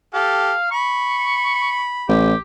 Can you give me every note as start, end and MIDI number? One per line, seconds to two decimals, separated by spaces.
0.14 0.53 67
0.14 0.53 69
0.14 0.66 77
0.71 2.24 83
0.71 1.85 85
2.09 2.33 33
2.09 2.38 67